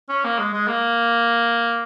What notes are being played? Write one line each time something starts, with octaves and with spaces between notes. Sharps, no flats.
C#4
A#3
G#3
G#3
A#3